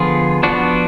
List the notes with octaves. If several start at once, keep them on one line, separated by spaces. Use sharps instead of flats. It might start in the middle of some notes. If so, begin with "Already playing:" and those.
Already playing: D3 F3 B3 F4 G#4
F3 B3 D4 F#4